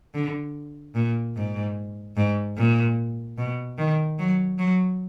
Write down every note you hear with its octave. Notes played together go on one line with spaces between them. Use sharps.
D3
A#2
G#2
G#2
A#2
B2
D#3
F#3
F#3